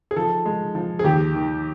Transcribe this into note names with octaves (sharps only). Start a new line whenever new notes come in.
G#4
F3 A4
G#3
F3
G#4
D#2 G4
D#3